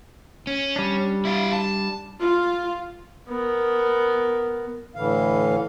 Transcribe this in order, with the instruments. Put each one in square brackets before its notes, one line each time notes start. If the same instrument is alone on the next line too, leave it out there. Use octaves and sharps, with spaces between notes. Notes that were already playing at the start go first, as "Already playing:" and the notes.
[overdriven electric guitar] C#4
[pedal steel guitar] G3 D4
[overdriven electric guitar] E4 F5
A5
[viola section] F4
[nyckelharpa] B3 A#4
[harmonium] A2 D3 E3 F5